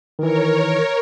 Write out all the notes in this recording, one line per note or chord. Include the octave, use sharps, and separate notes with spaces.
D#3 E3 A#4 C#5